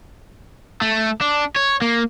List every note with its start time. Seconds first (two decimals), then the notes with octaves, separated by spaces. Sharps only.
0.82 A3
1.21 D4
1.56 C#5
1.82 A#3